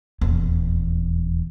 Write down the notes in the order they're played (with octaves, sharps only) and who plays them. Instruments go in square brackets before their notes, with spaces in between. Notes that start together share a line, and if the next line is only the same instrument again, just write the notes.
[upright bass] D#1 E2